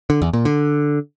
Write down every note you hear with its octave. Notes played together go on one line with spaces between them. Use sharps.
D3
E2
A#2
D3